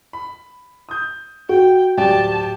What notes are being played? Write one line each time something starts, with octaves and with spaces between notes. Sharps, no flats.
B5
D#6 G6
F#4 G5
D1 G4 D5 G5 A5